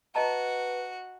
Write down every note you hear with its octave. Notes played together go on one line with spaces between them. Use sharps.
F#4 B4 D#5 A5 A#5